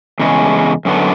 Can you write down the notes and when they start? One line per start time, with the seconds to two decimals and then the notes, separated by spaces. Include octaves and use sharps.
0.19 E2 C#3 G#3
0.85 F#2 D3 F#3 B3